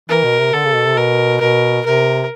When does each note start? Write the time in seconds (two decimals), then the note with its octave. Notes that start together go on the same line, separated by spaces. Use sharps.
0.09 E3 A#4
0.24 B2
0.39 C3
0.53 D3 A4
0.64 C#3
0.75 B2
0.86 C3
0.97 B2 A#4
1.41 B2 A#4
1.86 C3 A#4